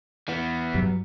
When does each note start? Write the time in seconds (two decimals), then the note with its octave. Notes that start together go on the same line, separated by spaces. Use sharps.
0.29 E3 B3
0.75 G2 F#3 G3